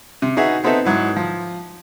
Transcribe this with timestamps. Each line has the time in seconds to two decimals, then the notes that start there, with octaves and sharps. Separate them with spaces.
0.22 C3
0.37 D#4 F#4 G#4 B4 E5
0.64 B3 C4 D#4 A4 E5
0.85 G#2 F#3 E4
1.16 F3